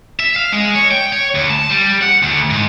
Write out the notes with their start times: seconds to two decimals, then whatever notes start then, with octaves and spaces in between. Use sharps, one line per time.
0.20 E5
0.36 F5
0.52 G#3
0.75 C#5
0.91 G5
1.12 C#5
1.35 D2
1.50 A5
1.70 G3
2.02 F#5
2.23 D2
2.50 G#2